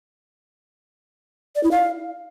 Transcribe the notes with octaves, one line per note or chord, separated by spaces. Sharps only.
D5
E4
F5